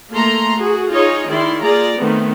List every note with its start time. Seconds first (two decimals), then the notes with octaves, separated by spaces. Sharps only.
0.13 A3 A#3 A4 A#5 C6
0.58 F#4 G#4
0.90 D#4 F4 G#4 C#5 D#5
1.29 D#3 E4 D5 C6
1.64 A#3 F4 G#4 D5 A#5
1.98 D#3 A3 B3 C4